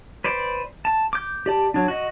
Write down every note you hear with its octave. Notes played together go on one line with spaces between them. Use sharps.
B4 C5 D5
A5
D6 G6
G4 D5 A5
F#3 D4
F#4 D#5